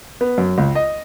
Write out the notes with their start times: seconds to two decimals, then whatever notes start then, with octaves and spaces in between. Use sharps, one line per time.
0.21 B3
0.38 F#2
0.58 C#2
0.75 D#5